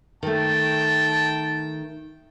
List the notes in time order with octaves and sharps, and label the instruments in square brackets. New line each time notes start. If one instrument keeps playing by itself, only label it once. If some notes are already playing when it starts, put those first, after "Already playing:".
[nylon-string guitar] D#3 A3 [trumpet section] G5 A5